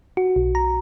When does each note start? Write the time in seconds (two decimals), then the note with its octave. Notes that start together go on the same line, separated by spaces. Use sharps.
0.17 F#4
0.36 B1
0.55 A#5